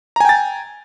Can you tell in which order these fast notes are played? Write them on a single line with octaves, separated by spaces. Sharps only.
A#5 G#5 G5 A6